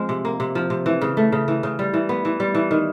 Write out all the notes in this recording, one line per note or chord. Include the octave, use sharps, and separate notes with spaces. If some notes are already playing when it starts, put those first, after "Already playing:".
Already playing: F3 G#3 C4
C3
A#3
C3
F3
C3
E3
C#3
A3
C#3
E3
C#3
G3
E3
B3
E3
G3
E3
D#3